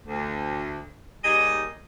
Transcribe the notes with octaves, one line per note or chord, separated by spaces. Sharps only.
D2
D#2 G3 D#4 G#4 D#5